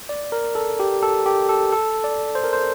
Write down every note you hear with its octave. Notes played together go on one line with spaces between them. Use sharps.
D5
A#4
A4
G4
A4
G4
A4
A4
D5
C5
A#4
C5